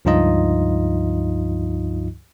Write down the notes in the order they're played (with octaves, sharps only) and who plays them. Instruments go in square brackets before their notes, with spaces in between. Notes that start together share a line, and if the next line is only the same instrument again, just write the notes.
[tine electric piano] C#2 G2 F3 D#4 F4 D#5